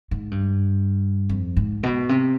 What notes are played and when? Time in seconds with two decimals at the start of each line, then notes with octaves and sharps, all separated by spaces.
0.11 G#2
0.31 G2
1.29 F2
1.57 G#2
1.83 B2
2.09 C3